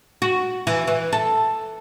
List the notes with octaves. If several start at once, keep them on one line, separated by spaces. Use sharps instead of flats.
F#4
E3
E3
A4